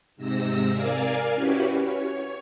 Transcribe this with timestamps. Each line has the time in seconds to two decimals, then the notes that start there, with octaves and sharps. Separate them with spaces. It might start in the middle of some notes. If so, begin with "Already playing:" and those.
0.17 G#2 C3 E6 A#6
0.71 A#4 D5 F5 G#5
1.34 C#4 E4 F#4 G4 B4
1.68 C#5